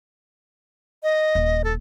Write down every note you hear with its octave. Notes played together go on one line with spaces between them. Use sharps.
D#5
D#1
A4